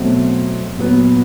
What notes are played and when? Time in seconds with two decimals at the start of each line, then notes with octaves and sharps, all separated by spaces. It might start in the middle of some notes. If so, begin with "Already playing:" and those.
Already playing: B2 F#3 A3 C4
0.78 A#2 F#3 B3